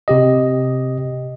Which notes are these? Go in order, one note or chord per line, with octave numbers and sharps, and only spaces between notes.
C3 G4 D#5